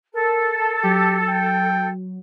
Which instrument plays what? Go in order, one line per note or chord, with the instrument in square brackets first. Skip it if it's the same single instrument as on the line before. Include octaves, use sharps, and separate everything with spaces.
[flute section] A4 [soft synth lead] A#4
[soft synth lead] F#3 [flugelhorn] G4
[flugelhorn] G5